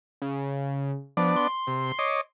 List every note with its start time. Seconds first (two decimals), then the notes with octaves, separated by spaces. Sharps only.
0.22 C#3
1.17 F3 B3 D4 D5
1.36 C6
1.67 C3
1.99 C#5 D#5 D6